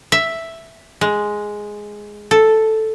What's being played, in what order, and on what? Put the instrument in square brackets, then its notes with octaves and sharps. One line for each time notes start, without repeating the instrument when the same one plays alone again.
[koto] E5
G#3
A4